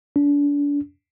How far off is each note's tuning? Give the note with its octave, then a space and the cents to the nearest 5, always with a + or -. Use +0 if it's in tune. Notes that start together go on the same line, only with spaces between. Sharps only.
D4 -35